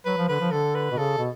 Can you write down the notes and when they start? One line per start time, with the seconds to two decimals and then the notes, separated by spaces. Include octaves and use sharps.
0.06 F#3 B4
0.17 F3
0.29 D3 B4
0.40 F3
0.51 D3 A4
0.75 B4
0.91 B2
0.98 C#3 A4
1.18 B2